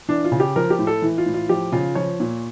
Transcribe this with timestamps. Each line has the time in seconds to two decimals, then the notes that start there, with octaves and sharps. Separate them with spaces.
0.08 E3 D4
0.24 F4
0.32 C#3
0.40 G4
0.56 F3 A#4
0.70 G4
0.79 A2
0.87 A4
1.02 E3
1.18 F4
1.26 A2
1.34 F4
1.49 F3 G4
1.72 C#3 F4
1.95 F3 C#5
2.20 A#2